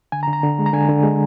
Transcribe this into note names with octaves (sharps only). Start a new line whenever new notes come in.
D3 G#5
A#5
D3
A#5
D3
G#3
A#5
D3 G#5
D3
G#3